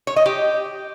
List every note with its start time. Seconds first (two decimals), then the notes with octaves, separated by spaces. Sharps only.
0.07 C#5
0.16 D#5
0.26 G4